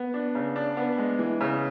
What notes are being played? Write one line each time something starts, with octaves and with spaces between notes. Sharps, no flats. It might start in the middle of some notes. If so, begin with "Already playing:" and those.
Already playing: B3
D4
C#3
D4
B3
G#3
E3
C#3